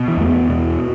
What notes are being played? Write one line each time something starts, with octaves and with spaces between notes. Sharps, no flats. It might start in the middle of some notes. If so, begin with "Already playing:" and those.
Already playing: B2
E3
E2 A3
B3
B2